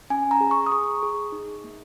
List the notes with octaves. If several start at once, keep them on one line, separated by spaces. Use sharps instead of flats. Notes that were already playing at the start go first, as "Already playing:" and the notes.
C#4 G#5
A#5
G#4
C#6
D#6
G#4 C#6
G#4
D#4
A#3